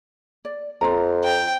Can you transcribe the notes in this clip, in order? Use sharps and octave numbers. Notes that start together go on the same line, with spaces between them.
D5
F2 F4 A#5
G5